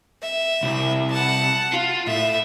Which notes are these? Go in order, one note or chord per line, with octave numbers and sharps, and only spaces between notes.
E5
C2
F#5 A5
F4
A2 E5